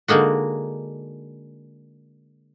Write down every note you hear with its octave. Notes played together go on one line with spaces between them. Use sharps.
D3 G#3 A#3 D#4 F#4